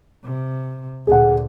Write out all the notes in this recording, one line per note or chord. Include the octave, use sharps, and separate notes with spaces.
C3
D2 A#2 G#4 F#5